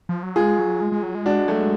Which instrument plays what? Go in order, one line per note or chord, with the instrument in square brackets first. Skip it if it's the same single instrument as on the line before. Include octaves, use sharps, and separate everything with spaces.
[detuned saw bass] F3
F#3
[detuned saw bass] G#3 [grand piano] F4 G#4
[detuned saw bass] F#3
G#3
G#3
F#3
G#3
[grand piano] D4 F#4
F#3 A3